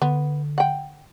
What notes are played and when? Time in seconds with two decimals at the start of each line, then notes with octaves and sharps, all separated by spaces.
0.02 D3 B3
0.58 F#5 G5